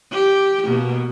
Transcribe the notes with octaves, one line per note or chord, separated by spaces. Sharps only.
G4
B2 A#3